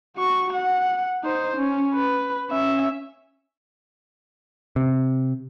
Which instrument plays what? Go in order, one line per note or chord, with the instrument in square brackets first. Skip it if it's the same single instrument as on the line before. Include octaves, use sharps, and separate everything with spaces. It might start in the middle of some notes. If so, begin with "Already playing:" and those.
[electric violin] F#4 C#6
F#5
D#4 C5
C#4
B4
C#4 E5
[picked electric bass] C3